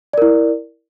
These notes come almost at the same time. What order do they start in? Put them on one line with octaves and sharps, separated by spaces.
D5 A#4 E4